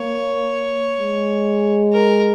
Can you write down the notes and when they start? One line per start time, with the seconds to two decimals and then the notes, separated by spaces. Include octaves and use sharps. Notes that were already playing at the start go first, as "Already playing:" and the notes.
Already playing: A#3 C#5
0.99 G#3
1.93 A#4